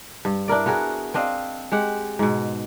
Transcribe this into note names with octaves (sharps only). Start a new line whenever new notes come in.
G2
D4 E4 A#4 D5
B3 F#4 G#4 A#4
C4 D4 D#5 F5
G#3 G4 F#5
G#2 B2